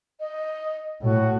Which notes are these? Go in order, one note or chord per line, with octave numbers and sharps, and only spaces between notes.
D#5
A2 F#4